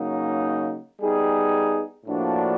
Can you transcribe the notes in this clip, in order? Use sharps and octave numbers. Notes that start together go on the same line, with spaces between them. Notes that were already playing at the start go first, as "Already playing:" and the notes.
Already playing: C#3 F#3 A#3 D#4
G3 B3 D#4 G#4
A2 F3 A#3 D4 F#4